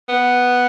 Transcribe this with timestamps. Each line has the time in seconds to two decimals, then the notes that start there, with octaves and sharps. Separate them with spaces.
0.09 B3